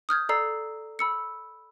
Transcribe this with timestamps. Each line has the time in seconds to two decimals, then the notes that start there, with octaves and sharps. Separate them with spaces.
0.09 D#6 F6 G6 G#6
0.29 A4 D5 A#5 E6 C7
0.99 B5 E6 C#7